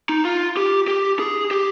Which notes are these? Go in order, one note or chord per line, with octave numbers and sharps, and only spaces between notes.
D#4
F4
G4
G4
G#4
G4